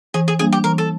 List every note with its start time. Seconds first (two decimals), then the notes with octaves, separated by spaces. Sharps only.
0.14 E3 G#4
0.28 G#4
0.39 G3 A#3 D4 G#4
0.53 G4
0.64 E3 A#4
0.78 A4